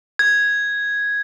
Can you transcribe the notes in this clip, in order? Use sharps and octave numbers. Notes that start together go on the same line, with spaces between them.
G#6